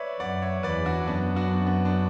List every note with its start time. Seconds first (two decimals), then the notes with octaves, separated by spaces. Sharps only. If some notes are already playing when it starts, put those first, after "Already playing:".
Already playing: B4 C#5 D5 E5
0.20 F#2 D5 F#5
0.42 C#5 E5
0.63 E2 B4 D5
0.85 D4 F#4
1.07 F#2 B3 D4
1.36 D4 F#4
1.66 B3
1.85 D4